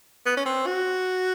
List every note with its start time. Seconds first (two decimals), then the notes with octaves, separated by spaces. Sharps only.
0.26 B3
0.37 C#4
0.46 C4
0.67 F#4